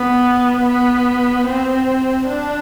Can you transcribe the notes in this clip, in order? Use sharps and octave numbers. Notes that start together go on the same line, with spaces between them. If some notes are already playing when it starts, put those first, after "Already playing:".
Already playing: B3
B3
C4
D4